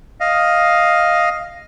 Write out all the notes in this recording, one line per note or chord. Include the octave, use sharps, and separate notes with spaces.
D#5 F5